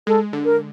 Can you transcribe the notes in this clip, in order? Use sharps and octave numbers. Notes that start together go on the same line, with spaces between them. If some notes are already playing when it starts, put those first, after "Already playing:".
G#3 A4
D3
A#4